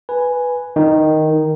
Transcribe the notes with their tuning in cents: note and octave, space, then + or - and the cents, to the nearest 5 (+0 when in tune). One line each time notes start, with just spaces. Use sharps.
B4 +0 G#5 +0
D#3 +0 D#4 +0